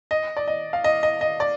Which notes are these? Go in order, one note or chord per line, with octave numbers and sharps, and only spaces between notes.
D#5
D5
D#5
F5
D#5
D#5
D#5
D5